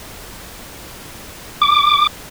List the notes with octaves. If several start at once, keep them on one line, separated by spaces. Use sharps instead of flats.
D6